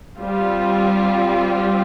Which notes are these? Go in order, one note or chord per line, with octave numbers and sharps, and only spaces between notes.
G3 C4 F4